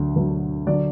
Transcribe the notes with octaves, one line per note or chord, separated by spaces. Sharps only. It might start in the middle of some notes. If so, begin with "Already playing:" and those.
Already playing: D2 D3 F#3
D2 D3 F#3
D3 F#3 D5